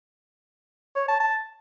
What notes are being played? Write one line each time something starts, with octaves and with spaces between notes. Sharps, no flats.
C#5
A5
A5